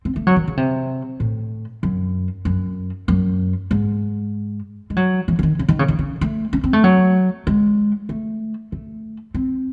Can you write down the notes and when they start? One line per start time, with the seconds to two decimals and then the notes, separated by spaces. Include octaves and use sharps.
0.05 C4
0.16 A3
0.27 F#3
0.36 D#3
0.47 C#3
0.57 C3
1.20 A2
1.83 F#2
2.45 F#2
3.08 F#2
3.71 G#2
4.90 G#3
4.96 F#3
5.28 E3
5.39 E3
5.43 D#3
5.59 C#3
5.68 D#3
5.79 C#3
5.88 D#3
5.99 C#3
6.21 A3
6.53 C#4
6.64 C4
6.73 A3
6.84 F#3
7.47 G#3
8.09 A3
8.72 A3
9.34 C4